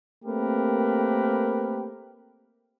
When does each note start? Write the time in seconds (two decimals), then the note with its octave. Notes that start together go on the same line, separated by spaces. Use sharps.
0.25 A3 A#3 C4 G4 A#4 B4